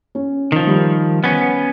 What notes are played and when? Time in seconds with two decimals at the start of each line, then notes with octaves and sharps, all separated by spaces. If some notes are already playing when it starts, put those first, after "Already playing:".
0.15 C#4
0.52 D#3 F3
0.67 G3
1.24 B3 C#4